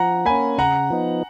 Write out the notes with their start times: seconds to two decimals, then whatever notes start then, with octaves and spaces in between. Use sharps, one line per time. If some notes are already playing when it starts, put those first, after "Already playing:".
Already playing: F3 F#5 A#5
0.25 A#3 C#4 G#5 B5
0.58 C#3 F#5 A#5
0.90 F3 B3 D#4